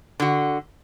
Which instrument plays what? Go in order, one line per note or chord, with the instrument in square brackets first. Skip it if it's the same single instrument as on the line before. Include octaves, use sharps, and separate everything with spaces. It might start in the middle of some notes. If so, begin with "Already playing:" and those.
[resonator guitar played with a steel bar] D3 F#4